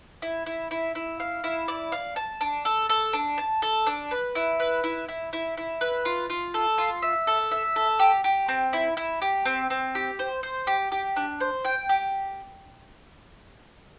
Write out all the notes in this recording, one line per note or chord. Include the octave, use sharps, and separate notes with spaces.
E4
E4
E4
E4
F5
E4
D5
F5
A5
D4
A4
A4
D4
A5
A4
D4
B4
E4
B4
E4
E4
E4
E4
B4
F4
F4
A4
F4
E5
A4
E5
A4
G4
G4
C4
E4
E4
G4
C4
C4
G4
C5
C5
G4
G4
D4
C5
G5
G4